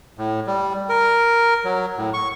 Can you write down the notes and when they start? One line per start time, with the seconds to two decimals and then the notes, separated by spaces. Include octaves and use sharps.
0.18 A2
0.47 G3
0.89 A#4
1.65 F#3
1.97 A2
2.14 C#6